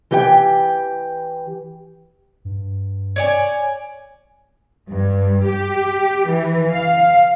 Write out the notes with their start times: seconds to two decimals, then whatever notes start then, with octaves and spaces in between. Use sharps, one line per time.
0.11 E3 G4 G5
2.45 G2
3.16 C#5 D5 G#5
4.90 G2
5.47 G4
6.27 E3
6.73 F5